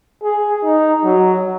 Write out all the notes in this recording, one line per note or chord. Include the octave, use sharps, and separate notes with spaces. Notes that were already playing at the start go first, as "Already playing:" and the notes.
G#4
D#4
F#3